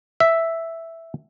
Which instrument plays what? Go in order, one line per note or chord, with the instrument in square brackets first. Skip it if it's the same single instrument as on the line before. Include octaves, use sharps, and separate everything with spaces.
[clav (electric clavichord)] E5